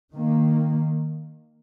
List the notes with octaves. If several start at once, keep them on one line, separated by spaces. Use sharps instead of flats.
D#3 A#3